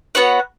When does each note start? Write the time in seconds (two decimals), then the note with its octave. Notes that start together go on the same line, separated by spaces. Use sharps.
0.15 B3 F#4 C#5 F#5